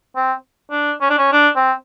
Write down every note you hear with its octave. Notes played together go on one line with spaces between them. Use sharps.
C4
D4
C#4
D4
C#4
D4
C4